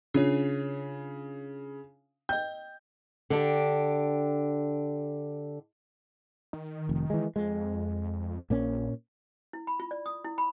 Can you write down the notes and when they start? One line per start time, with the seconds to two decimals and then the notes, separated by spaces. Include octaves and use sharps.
0.14 C#3 D4 F4 C#5
2.29 D#5 G5 G6
3.30 D3 D4 G4
6.53 D#3
6.89 F1
7.10 E3 G#3
7.36 F2 G#3
8.50 A#1 A#2 A#3 C#4
9.53 E4
9.67 B5
9.80 F4
9.91 D5
10.06 D#6
10.25 E4
10.38 B5